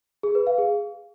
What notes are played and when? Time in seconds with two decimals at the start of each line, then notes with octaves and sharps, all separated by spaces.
0.23 G#4
0.35 B4
0.47 F5
0.58 G#4